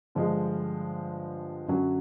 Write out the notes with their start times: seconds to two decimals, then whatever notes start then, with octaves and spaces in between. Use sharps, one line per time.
0.15 G2 D3 F3 G#3
1.68 F#2 D3 F#3